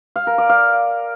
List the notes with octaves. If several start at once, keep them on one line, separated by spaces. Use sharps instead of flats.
F5
A#4
D5
F5